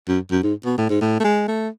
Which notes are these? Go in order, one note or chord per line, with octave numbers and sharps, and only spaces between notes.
F#2
F#2
G#2
B2
A2
G#2
A2
A3
G#3
A3